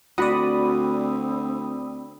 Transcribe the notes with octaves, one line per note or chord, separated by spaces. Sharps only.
D2 C4 F#4 D5 B5 D#6